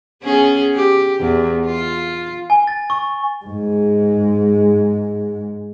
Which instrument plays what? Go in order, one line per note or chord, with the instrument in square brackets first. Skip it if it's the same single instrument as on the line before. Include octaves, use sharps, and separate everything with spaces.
[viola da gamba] B3 C#4 G#4
G4
E2
F4
[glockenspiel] G#5
A6
C#6
[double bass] G#2 G#3